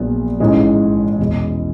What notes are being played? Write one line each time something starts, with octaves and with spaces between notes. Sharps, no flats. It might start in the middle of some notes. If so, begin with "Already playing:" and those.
Already playing: A#1 A#2 F#3 B3
A1 G#2 E3 G#3
E2 B2 G#3